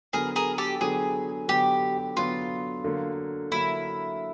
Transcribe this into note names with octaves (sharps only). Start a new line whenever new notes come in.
D3 F#3 B3 G#4 A#4
G#4 A#4
G4 A4
D3 F#3 B3 G#4
D3 F#3 B3 G4
D3 F#3 B3 F4
D3 F#3 A#3
D3 F#3 A#3 E4